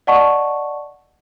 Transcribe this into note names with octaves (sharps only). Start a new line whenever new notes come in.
D5 D#5 F#5 A5 C#6